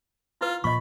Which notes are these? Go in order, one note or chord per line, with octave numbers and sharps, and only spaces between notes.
E4 F4 B4
A#2 F3 D#5 B5 C#6